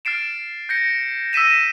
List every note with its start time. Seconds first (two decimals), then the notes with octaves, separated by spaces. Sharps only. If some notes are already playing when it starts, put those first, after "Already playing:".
0.05 F6 A6 C7 D7 E7
0.69 G6 A#6 C#7
1.33 E6 A#6 B6 D#7 E7